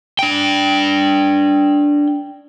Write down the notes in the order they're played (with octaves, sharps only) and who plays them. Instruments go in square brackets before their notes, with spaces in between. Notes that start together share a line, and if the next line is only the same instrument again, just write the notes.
[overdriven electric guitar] D4 G5